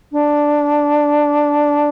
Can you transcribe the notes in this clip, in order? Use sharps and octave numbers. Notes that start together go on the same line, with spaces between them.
D4